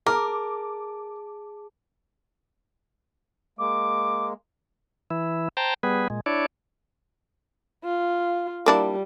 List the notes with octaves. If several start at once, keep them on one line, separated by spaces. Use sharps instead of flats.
G#4 A#4 A5 D6
G#3 A#3 D6
E3 E4
C5 G5 A5 A#5
G3 B3 G#4 B4
A#2 G#3
D4 E4 C#5 D5
F4
G3 A#3 D4 E4